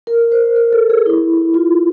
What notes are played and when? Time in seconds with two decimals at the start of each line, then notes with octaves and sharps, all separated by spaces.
0.07 A#4
0.32 C5
0.56 A#4
0.73 A4
0.90 G#4
1.06 E4
1.54 F4